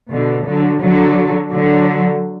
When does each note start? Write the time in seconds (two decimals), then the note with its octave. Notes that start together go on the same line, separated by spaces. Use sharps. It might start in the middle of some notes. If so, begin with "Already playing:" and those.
0.11 B2 D3
0.46 D3 F#3
0.81 D3 F#3
1.50 D3 F#3